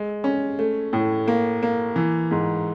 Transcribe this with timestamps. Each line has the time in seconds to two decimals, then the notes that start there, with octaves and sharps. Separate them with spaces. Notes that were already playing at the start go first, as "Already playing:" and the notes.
Already playing: G#3
0.24 C#4
0.59 A3
0.93 A2
1.28 A#3
1.63 A#3
1.96 E3
2.31 G#2